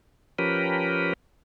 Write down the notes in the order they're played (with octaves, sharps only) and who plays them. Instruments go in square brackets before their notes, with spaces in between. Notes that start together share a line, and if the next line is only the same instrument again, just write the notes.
[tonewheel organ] F3 C#4 G4 A#4 B4